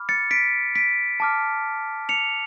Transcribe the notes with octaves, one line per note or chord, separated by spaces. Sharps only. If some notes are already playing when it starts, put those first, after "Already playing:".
Already playing: B5 D6 F6
A6 C#7
B6 D7
B6 D7
A5 D6 F6
C#7 F7